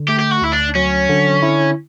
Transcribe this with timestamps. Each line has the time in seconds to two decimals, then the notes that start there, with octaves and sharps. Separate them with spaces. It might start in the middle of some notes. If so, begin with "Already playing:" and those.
Already playing: D3
0.08 A3 G4
0.19 G4
0.31 F#4
0.42 D2 E4
0.52 D4
0.75 F#3 C#4
1.09 D3
1.42 E4